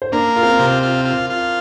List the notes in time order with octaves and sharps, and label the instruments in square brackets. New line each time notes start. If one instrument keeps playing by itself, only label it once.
[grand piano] C5
[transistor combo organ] A#3 [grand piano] D4 D5
[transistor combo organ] F4 [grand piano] A#4
[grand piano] C4 C5
[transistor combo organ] C3
F4
F4
F4